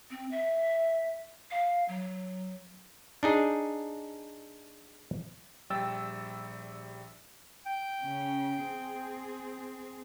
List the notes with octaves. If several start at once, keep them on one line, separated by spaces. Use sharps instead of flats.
C4
E5
F5
F#3
D4 D#4 G#4
A#1 G3 G5 E6 A6
G5
C#3 C#4
C4 G#4